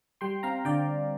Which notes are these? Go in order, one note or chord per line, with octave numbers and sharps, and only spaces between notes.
G3 G5 C6
C4 F5 A#5
D3 D5 G5